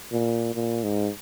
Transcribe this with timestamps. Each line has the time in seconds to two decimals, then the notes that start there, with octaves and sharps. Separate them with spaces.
0.12 A#2
0.55 A#2
0.84 G#2